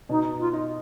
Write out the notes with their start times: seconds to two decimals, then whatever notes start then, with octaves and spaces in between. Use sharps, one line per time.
0.09 B2 D#4
0.40 F4
0.53 D#4